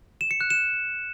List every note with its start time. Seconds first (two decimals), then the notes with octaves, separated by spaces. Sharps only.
0.21 E7
0.31 C#7
0.41 F#6
0.50 E7